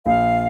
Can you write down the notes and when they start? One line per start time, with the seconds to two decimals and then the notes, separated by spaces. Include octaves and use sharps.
0.05 A#1 F5